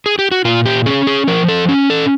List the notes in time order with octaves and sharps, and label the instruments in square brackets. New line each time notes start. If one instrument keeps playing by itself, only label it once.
[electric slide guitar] G#4
G4
F#4
A#2 F4
G4
C#4 G#4
G#4
F3 A#4
A4
C#4
A4